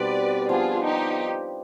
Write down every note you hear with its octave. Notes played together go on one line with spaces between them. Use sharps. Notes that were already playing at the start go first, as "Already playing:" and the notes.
Already playing: B2 G3 C4 D#4 B4 D5
F3 B3 D4 F4 G#4
D#4 G4